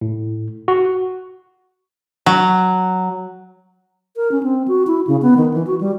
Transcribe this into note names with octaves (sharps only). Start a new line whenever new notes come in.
A2
F#4
F#3
A#4
C#4
C4
F#4
E4
C#3
B3
D#3
E3
F#4
G3